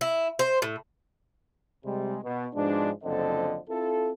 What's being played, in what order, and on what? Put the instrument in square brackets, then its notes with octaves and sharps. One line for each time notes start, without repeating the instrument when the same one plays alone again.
[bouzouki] E4
C5
A2
[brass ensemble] C3 G3 G#3
B2
G#2 B2 F3 G#3 D4
F#1 D3 F3 C4 A4 D#5
C4 E4 F4 A4